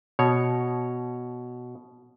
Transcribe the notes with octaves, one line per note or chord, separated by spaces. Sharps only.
B2 C#5